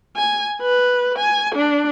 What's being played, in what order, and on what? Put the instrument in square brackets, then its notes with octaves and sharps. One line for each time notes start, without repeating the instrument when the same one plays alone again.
[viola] G#5
B4
G#5
D4